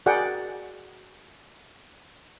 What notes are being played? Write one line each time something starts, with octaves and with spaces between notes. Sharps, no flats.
F#4 G#4 A#4 D5 F#5 G5